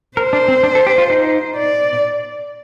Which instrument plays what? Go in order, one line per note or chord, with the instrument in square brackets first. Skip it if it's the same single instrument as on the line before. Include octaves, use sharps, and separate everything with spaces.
[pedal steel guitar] A#4 [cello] C5
[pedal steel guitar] D4
C4
D4
A4
G4
F4
D#4
[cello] D5